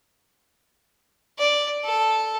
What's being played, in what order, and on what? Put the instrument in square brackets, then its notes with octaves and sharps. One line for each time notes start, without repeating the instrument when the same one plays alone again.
[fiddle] D5
A4